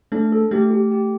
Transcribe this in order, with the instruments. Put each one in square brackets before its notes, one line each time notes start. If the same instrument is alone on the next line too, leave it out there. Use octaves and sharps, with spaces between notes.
[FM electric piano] A3 [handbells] D4
[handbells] A4
[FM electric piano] A3 [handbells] G4
[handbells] G4
G4